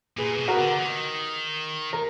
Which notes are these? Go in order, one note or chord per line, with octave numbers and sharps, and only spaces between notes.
A#2 G#4 B4
B2
F#4 A#4
D3
D#3
A#4